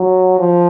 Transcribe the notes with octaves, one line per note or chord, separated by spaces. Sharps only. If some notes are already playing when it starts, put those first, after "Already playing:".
Already playing: F#3
F3